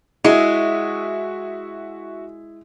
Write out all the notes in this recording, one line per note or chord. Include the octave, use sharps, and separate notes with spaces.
G#3 E4 F#4 E5 D#6